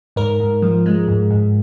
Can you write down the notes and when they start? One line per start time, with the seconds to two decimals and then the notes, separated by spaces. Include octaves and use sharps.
0.16 G#2 A#4
0.40 G#2
0.62 F3
0.86 G#3
1.08 G#2
1.31 G#2